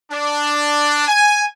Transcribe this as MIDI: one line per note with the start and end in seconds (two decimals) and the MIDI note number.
0.12 1.05 62
1.08 1.44 80